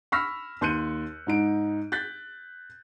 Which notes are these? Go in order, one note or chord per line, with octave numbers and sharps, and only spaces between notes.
B5 C#6 E6 F6 A#6 B6
D#2 C6 F#6 G6 C#7 D#7
G#2 D#4 D7
F#6 G6 A6 B6